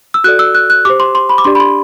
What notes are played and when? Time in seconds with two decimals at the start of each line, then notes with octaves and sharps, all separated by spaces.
0.14 E6
0.24 F#4 A4 D5 F#6
0.39 E6
0.55 F#6
0.70 F#6
0.85 G4 C5 D6
1.00 C6
1.15 C6
1.29 B5
1.38 D6
1.44 D4 G4 D5 C6
1.55 B5
1.60 C6